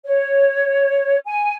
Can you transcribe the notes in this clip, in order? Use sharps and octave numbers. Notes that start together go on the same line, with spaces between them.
C#5
G#5